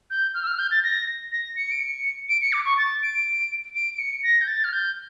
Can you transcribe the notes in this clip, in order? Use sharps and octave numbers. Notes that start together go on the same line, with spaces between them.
G6
F6
E6
F6
G6
A6
A#6
A#6
C#7
D7
C#7
D7
C#7
D6
C#6
A6
D7
D7
D7
C#7
A#6
G6
A6
F6
G6